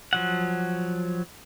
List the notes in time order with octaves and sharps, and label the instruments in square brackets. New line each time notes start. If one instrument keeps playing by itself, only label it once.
[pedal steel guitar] F3 F#3 F#5